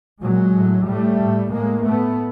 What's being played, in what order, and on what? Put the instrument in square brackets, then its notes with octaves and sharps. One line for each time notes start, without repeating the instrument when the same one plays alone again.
[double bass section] A#2 F#3 G#3
A2
A2 G3 A3
A2
A2 G#3 A#3
A2 A3 B3